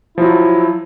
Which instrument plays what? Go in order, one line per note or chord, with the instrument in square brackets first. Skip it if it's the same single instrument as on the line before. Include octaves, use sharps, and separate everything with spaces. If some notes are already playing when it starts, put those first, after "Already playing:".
[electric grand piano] F3 F#3 [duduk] E4